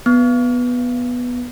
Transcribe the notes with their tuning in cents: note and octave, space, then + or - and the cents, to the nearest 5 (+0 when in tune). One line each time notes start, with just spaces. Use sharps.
B3 -5